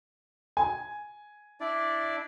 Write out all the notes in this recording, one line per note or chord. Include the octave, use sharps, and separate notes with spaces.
G#5
D4 E4 D5